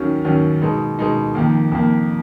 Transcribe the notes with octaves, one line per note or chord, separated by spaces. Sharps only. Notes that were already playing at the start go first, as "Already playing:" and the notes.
Already playing: D#2 D#3 F#3 C#4
D#2 D#3 F#3 C#4
B2 G#3 D#4
B2 G#3 D#4
F2 D#3 A#3
F2 D#3 A#3